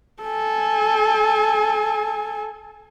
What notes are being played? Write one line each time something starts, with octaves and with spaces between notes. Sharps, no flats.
A4 G#5